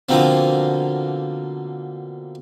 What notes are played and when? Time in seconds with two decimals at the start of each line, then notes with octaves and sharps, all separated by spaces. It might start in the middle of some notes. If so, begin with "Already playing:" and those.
0.09 B2 D3 F3 A#3 C4